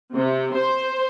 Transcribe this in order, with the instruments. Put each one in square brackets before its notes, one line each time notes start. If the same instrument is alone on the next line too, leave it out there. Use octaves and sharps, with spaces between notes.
[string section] C3
C5